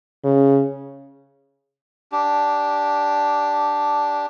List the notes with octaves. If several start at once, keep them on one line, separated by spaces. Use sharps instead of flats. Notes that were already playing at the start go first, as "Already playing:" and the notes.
C#3
D4 G4